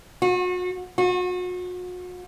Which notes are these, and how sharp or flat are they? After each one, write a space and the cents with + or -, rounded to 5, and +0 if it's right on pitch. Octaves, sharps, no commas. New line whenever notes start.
F#4 -40
F#4 -40